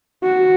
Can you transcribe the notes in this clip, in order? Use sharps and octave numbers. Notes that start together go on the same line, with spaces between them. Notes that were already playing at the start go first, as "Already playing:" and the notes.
F#4